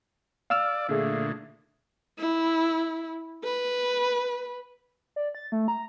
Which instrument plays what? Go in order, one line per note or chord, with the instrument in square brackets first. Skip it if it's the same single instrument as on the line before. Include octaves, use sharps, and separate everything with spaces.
[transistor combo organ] D5 [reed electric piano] F5 E6 F6
[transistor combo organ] A#2 D3 [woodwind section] A3 G#4
[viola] E4
B4
[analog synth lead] D5
A6
A3
A#5